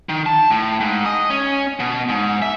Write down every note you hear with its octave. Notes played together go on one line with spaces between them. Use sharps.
D#3
A5
A2
G#2
D#5
C#4
B2
G#2
E5